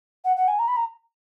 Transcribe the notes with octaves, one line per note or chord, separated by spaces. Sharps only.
F#5
F#5
G#5
A#5
B5
A#5